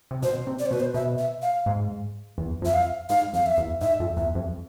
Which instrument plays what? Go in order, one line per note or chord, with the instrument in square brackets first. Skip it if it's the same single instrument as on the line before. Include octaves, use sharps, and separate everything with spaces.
[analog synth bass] C3
[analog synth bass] B2 [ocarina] C5
[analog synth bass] C3
[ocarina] D5
C5
[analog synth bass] B2 [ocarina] B4
[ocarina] C5
[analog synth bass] B2 [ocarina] E5
[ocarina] E5
F5
[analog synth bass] G#2
E2
F2
[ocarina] E5
F5
[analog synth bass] G#2 [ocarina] F5
[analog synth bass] F2 [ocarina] F5
[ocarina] E5
[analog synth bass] E2
[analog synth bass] G#2 [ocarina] E5
[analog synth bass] F2
[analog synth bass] E2 [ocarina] E5
[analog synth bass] F2